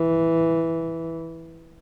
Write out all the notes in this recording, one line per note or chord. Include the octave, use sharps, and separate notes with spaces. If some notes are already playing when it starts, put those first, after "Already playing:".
Already playing: E3